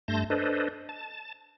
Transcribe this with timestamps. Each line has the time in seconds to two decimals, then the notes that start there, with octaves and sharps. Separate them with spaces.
0.08 G2 A3 A5 C6 G6 A#6
0.30 D4 A4 B4 C5 D#5
0.89 A5